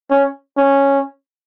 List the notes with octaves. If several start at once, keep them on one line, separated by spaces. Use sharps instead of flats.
C#4
C#4